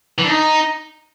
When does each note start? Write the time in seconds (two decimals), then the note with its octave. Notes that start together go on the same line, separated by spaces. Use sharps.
0.18 E3
0.24 D4
0.30 D#4